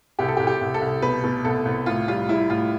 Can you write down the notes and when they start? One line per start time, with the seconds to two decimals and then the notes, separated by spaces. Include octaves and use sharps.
0.19 C2 G4
0.28 A4
0.37 G4
0.40 C2
0.47 G4
0.61 C2
0.74 A4
0.81 C2
1.02 B2 B4
1.24 B2
1.45 C2 A4
1.65 C2
1.86 A2 F4
2.08 G3 F4
2.29 G3 E4
2.50 A2 F4